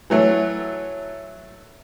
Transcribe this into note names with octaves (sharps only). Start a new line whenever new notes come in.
E3 F#3 A3